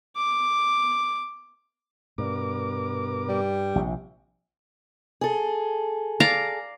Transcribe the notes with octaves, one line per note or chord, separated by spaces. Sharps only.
D6
G2 B2 A#4 D6
G3
A#1 C3
G#4 A4
D5 F5 A#5